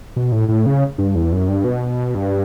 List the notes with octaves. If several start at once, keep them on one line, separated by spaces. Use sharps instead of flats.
B2
A2
A2
C#3
G2
E2
F#2
G2
B2
G2